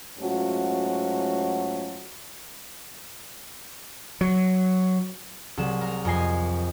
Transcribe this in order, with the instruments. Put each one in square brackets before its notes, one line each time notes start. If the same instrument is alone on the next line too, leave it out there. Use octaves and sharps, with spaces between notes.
[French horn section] G#2 F#3 A3 C#4 F4 F#4
[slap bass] F#3
[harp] C2 F#3 G#4 E7
A#4
F2 D#5 G#5 C7